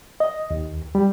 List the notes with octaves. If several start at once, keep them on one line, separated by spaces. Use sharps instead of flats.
D#5
D#2
G3